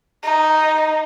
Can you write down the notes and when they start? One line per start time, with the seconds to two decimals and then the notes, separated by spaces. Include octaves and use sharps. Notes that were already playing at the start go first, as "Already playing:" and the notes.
0.23 D#4